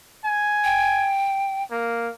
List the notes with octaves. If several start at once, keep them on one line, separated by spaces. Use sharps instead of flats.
G#5
G5
A#3